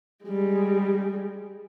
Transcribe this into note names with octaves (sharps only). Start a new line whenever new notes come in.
G3 G#3